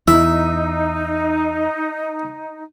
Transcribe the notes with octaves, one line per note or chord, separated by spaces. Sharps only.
E2 D#4 E4 E5